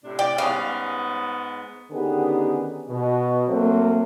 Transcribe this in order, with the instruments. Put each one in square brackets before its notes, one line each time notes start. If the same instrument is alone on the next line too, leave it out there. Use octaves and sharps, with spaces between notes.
[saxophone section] A2 C3 D4
[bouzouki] D5 [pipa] G5
[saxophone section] G#2 B3 [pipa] C#3 G3 C#4 [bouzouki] F5
[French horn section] D3 D#3 B3 C#4 G4 G#4
B2
F#3 A3 A#3 C4